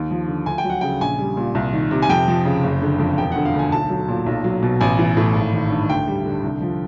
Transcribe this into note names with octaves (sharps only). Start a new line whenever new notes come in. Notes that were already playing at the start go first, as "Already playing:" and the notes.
Already playing: D#2
F3
D3
D2 G#5
G5
F#3
F#5
C#3 G5
A#1 G#5
G3
A#2
C2
D#3
C3
G#5
F2 G5
F3
C#3
F#1
D3
F2
E1 G5
D3 F#5
F5
D2 G#5
B1 A5
F#3
A#2
B1
F#3
B2
A1 G#5
E3
A2
G#1
D#3
G2
D2 G5
G3
D3
C2
F3